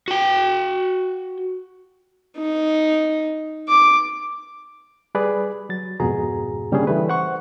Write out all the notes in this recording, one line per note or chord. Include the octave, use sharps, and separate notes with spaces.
F#4 G5
D#4
D6
G3 G#4 B4 D5
F#3 A6
F2 G#2 B2 F#4 G#4 A#5
C#3 G3 A#3 C#4 D4 G#4
E3 G3 A3 B4
C5 F#5 C#6